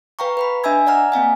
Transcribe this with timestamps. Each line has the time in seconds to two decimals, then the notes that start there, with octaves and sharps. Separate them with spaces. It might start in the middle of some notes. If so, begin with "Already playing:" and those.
0.19 B4 F5 G5 A#5 C#6
0.37 B4 G5 B5
0.64 D4 D#5 E5 G#5 E6 G#6
0.87 D5 D#5 F#5 A#5 F6
1.12 A#3 C4 F5 G#5